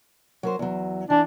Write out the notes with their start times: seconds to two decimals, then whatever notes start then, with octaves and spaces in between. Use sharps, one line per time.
0.43 F#3 A#4 C5
0.59 E2 F#3
1.10 E3 D4